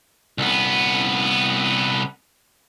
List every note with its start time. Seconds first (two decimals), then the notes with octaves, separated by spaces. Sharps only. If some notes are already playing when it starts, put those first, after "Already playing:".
0.38 C2 B3